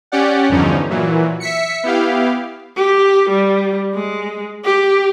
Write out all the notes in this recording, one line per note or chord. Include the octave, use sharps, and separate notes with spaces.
C#4 G4 D5 F#5
E2 G2 D3 F3 C#4 D#4
A#2 E3 F#3
E5 B6 C#7
B3 E4 G4 F5
G4
G3
G#3
G4